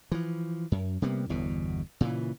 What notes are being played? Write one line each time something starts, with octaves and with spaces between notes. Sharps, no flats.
E3 F3
F#2
C3 G3 A#3 B3
G1 E2 B2
A#2 C#3 E3